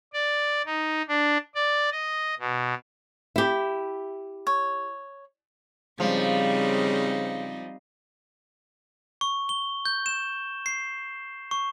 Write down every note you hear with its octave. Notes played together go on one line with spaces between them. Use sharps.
D5
D#4
D4
D5
D#5
B2
E4 G4
C#5
C#3 F3 G3 C4 D#4
C#6
G7
G6
E7
C7
C#6